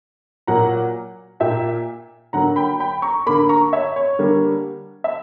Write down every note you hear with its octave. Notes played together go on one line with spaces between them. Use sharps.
A#2 F#3 A#3 F#5 A#5
A#2 A#3 E5 G5
D3 F#3 A#3 F#5 A#5
G5 B5
G5 B5
A#5 C#6
D3 A#3 B5 D6
A#5 C#6
C#5 E5
C#5
D3 G3 A#3
E5